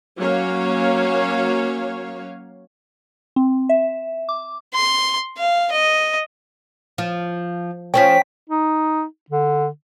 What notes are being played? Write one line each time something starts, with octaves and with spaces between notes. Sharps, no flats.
F#3 A#3 C#4 C#5 F5
C4
E5
D6
C6
F5
D#5
F3
F3 C4 C#4 G5 B6
D#4
D3